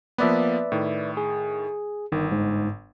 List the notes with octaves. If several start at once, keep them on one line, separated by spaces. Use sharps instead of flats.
F3 A#3 B3 B4 D5 E5
A2 D#3
G#4
G1 D#3
G#2